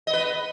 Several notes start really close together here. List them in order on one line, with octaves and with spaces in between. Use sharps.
D#5 B3 B4